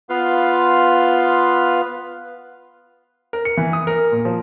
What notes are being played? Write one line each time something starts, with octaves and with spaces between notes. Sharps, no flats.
B3 F4 B4 F5 C6
A#4
C#7
E3
D#6
A#4
A#2
F3